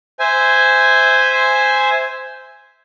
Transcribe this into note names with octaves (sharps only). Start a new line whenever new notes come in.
C5 E5 G#5